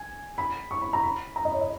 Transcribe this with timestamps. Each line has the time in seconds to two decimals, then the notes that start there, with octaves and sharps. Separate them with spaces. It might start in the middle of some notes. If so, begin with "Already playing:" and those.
Already playing: G#5
0.38 B5
0.71 C#6
0.81 B5
0.93 A#5
1.03 B5
1.36 A#5
1.45 D#5
1.54 C#5
1.61 D#5